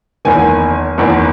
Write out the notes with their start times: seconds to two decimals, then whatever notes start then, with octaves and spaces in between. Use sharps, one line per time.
0.25 F#1 E2 D#3 G#5
0.98 F#1 E2 D#3